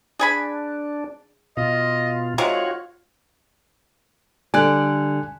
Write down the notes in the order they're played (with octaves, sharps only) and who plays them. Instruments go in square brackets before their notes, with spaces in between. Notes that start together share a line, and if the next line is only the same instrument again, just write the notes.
[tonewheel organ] D4 [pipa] G#4 G#5 B5
[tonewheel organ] B2 F4 [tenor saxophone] D#5
[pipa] C3 D#3 G#3 [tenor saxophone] F4 [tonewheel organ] F#4 C#5
[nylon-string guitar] D3 G3 D5 [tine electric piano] G#5 F#6